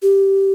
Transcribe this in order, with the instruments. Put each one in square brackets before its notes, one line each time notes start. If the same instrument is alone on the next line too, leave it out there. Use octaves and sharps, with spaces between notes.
[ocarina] G4